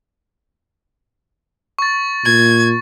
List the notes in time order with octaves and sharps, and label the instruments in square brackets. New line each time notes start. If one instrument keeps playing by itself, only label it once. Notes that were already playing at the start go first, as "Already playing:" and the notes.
[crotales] C#6 A6
[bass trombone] A#2 [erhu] G#6